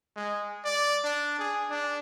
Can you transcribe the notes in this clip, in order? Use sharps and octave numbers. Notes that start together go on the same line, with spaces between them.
G#3
D5
D4
G#4
D4